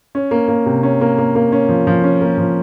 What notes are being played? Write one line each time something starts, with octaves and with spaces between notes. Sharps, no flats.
C#4
A#3
A#3
C3
C#4
A#3
A#3
A#3
C#4
F3
F3
C#4
A#3
F3